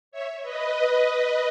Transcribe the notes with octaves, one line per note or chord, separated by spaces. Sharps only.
C#5 E5
B4 D#5